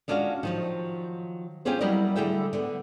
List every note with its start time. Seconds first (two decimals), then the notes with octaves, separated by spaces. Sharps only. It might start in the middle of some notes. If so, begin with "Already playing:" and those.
0.08 G#3 C#4 D4 F4 F#4 F5
0.43 D#3 F3 F#3
1.65 C4 C#4 F4 G4 G#4 C5
1.81 F#3 G3 E4 A#4 D5 D#5
2.16 D3 G3 A3 G#4 E5 G5
2.53 D3 B3